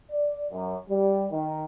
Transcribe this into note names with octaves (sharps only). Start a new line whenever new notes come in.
D5
F#2
G3
D#3